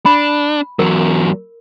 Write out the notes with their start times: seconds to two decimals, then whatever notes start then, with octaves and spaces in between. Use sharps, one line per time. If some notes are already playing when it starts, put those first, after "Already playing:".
0.05 D4 B5
0.79 E2 F#3 A#4